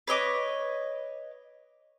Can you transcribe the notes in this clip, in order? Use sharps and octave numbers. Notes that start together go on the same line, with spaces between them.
B4 C#5 D#5 D6